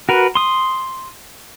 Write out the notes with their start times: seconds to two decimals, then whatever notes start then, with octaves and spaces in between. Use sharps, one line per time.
0.09 F#4 A#4 B4
0.35 C6 D#6